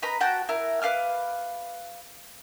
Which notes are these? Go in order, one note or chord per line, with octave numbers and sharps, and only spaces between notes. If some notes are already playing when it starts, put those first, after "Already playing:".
D#4 B4 A#5 B5
F#4 F#5 G5 A5
E4 A#4
B4 F5 D6 F6